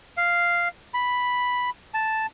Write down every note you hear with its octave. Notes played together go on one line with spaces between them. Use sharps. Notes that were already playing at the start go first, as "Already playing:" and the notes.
F5
B5
A5